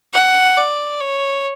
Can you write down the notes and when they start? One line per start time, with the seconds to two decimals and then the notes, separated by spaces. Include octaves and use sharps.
0.13 F#5
0.57 D5
1.00 C#5